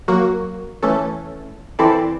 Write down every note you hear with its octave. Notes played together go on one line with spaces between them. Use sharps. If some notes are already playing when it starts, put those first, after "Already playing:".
F#3 A#3 F#4
E3 A3 C#4 A4
E3 C4 E4 A4 D5